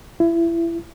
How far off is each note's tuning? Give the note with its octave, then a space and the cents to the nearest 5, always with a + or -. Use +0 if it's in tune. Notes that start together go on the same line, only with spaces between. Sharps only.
E4 +25